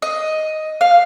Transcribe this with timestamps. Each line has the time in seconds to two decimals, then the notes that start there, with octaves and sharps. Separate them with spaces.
0.02 D#5
0.81 F5